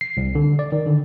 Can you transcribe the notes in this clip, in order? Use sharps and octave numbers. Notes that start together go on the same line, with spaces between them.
C7
C2
D3
D5
D#3
D3